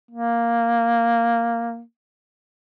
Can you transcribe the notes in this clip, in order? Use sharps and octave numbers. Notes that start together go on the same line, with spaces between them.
A#3